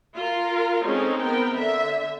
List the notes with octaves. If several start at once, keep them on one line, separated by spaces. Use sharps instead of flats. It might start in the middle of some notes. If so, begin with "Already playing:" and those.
F4 A#4
G#3 C4 C#4 D#4 G#4 A4
B3 C4 A#4 G5
D3 E5